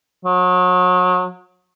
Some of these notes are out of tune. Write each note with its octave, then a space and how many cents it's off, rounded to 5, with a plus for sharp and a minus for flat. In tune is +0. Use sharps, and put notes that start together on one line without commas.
F#3 -35